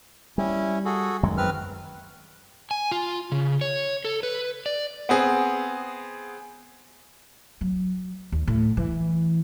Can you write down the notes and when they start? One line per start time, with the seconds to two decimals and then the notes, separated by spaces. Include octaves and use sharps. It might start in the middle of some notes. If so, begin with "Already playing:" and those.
0.38 G3 C#4 E4
0.85 F#4 G#4 A4
1.23 F#2 D#3 G#3
1.37 C4 B4 F6
2.71 G#5
2.91 F4
3.32 C#3
3.61 C#5
4.05 A4
4.23 B4
4.66 D5
5.09 B3 C4 G#4
7.61 F#3
8.32 D#2
8.48 A2
8.77 E3